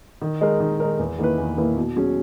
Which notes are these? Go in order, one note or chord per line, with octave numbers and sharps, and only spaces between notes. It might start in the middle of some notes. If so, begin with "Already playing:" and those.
D#3
G#3 D#4 A#4
D#3
G#3 D#4 A#4
E2
D#3 A#3 E4 B4
E2
D#3 A#3 E4 B4
B2
F#3 C#4 G#4